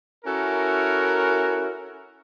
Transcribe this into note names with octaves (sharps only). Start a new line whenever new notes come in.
C#4 E4 F#4 A4 A#4